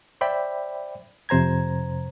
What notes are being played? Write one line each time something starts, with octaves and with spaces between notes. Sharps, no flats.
C5 D5 E5 G5 B5
F2 C3 C5 A#5 G#6